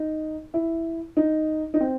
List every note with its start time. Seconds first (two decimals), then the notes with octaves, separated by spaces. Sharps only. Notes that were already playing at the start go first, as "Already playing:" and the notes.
Already playing: D#4
0.54 E4
1.17 D#4
1.74 D#4
1.81 C4